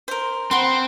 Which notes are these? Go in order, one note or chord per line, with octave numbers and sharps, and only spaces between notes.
A#4 C5
C4 F#5 B5 C6